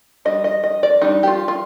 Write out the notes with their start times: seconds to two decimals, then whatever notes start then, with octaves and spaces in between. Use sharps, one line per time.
0.25 G3 D4 D#5
0.44 D#5
0.64 D#5
0.83 D5
1.02 G3 D4 D#4
1.23 G4
1.27 F4
1.48 F4